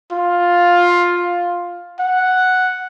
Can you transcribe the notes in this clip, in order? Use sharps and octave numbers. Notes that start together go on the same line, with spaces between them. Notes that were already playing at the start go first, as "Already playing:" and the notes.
F4
F#5